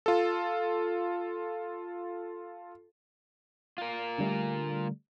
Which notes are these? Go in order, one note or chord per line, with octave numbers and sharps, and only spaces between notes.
F4 A4
F4 A#4
D3 G3 A3